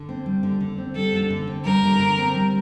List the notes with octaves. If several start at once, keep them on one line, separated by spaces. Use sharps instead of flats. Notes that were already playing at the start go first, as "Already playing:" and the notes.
Already playing: D3
C4
G3
D3
D3
C4
G3 A4
D3
D3
C4
G3 A#4
D3
D3
C4
G3